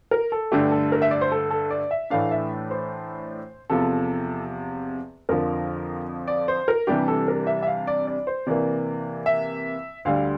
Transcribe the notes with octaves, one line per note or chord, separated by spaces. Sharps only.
A#4
A4
G2 D3 A3 G4
A4
A#4
E5
D5
C5
A4
A4
D5
E5
A2 E3 A3 D4 F5
E5
C5
E2 C3 F3 A4
F2 D3 F3 A#4
D5
C5
A#4
C3 E3 G3 D4 G4
A4
A#4
E5
E5
F5
D5
D5
C5
C3 E3 A#3 D5
E5
D2 D3 G3 F5